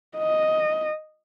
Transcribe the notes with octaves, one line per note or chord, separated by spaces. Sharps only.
D#5